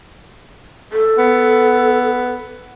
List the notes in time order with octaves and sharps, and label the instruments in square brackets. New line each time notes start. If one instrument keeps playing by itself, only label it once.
[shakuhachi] A4
[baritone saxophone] B3